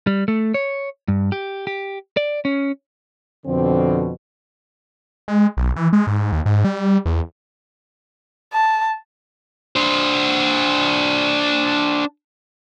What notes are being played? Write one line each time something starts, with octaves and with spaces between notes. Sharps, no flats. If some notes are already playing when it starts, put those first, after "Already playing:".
G3
A3
C#5
G2
G4
G4
D5
C#4
F2 B2 D3 C4
G#3
B1
E3
G#3
G#2
D#2
G#2
G3
E2
A5
D4 C5